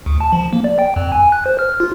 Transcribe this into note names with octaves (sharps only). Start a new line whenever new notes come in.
D2
A5
F3
A#3
D5
G5
F2
G#5
F#6
C5
F6
F4